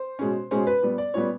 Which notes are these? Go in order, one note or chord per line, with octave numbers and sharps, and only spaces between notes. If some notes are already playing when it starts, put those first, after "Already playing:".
Already playing: C5
B2 G#3 C#4
B2 G#3 C#4 C5
B4
A#2 G3 B3
D5
A#2 G3 B3 C#5